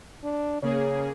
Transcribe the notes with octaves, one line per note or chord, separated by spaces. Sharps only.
D4
C#3 A#3 G#4 C#5